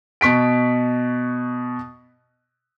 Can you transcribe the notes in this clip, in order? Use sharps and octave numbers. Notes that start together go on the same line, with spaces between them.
B2 C#6 B6 D7